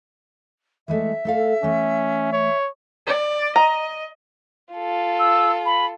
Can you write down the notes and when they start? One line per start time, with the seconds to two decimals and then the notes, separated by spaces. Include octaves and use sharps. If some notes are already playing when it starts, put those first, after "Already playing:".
0.88 E3 G#3 A3 E5
1.25 A3 A4 F5
1.63 E3 A3 C#4
2.33 C#5
3.07 D5
3.56 D#5 A#5
4.74 F4 A4
5.19 E6
5.66 B5